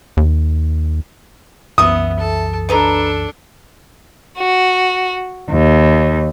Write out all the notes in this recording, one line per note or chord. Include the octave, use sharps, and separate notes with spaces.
D#2
C2 F#2 E3 B3 F#4 E5 D#6
A4 A5
B2 D4 A4 B4 A#5
F#4
D#2